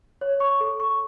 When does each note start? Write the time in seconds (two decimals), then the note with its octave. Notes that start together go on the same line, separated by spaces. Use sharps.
0.21 C#5
0.40 C#6
0.60 A4
0.80 C#6